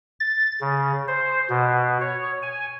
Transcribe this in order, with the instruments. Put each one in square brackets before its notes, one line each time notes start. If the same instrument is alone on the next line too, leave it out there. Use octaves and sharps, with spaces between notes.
[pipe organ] A6
C#3
C5
B2
C#5
G#5